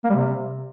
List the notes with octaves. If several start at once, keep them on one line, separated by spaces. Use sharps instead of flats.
A#3
G3
C3